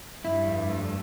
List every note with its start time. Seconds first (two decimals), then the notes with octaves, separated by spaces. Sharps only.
0.25 G2 E4
0.48 F2
0.70 A3